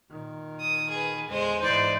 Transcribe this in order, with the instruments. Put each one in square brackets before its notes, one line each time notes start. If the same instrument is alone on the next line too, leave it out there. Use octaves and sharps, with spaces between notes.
[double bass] A#2 D#3
[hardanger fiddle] D#6
G#4 B4
[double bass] E2 D3 [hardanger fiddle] G#3 C5
[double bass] G#2 E3 [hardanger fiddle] D#4 D5 [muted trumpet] C5